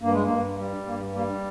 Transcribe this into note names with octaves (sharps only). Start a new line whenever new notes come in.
G2 A#3
G#3
A#3
G2
G3
G2 A#3
G3 A#3